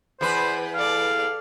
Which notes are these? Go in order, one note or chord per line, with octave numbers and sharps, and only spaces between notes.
E2 B4 C5 B5
A4 D5 F5